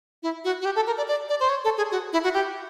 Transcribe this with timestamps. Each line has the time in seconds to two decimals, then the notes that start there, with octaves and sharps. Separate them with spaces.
0.23 E4
0.44 F#4
0.61 F#4
0.65 G4
0.76 A4
0.87 A#4
0.97 D5
1.08 D5
1.29 D5
1.40 C5
1.49 C#5
1.64 A4
1.77 G#4
1.91 F#4
2.13 E4
2.24 F#4
2.34 G4